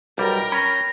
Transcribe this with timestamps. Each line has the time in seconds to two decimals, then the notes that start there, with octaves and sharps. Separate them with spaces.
0.18 B1 G3 A#4 G5 A#5
0.52 C#4 B5 A#6